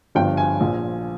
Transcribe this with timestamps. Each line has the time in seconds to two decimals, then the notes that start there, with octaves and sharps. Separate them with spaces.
0.15 G1 G2 F3 G5
0.37 G#5
0.60 A#1 A#2 F3